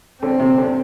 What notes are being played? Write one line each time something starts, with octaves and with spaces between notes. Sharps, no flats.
D3 C4
C3
D3